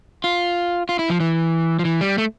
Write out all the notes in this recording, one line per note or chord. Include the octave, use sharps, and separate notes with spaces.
F4
F4
E4
F3
E3
F3
E3
G3
A3